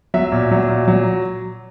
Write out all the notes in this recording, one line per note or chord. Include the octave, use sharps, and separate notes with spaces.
F#3 E5
A#2
F#3
A#2
F#3